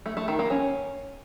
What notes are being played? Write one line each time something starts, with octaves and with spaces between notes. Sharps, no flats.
A3
A3
D#3
A#3
C#4